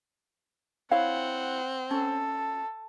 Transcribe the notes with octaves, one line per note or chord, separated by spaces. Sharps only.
C4 E4 C#5 F5 F#5
C#4 A4